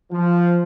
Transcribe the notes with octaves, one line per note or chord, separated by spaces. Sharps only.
F3